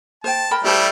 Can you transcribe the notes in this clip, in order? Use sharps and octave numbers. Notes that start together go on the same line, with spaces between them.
C5 G5 A5
A#4 G5 B5
G3 A3 E4 G4 C5 A5